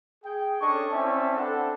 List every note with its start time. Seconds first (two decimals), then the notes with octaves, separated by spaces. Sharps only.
0.24 G#4 G5
0.61 C#4 D4 A4 D#5 C#6
0.92 C4 C#4 E4 D5 E5 A5
1.37 C4 D4 A4 B4 F#5